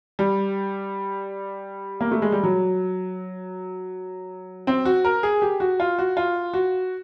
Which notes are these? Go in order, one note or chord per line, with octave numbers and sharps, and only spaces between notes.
G3
A#3
A3
G#3
G3
F#3
C4
F#4
A#4
G#4
G4
F#4
F4
F#4
F4
F#4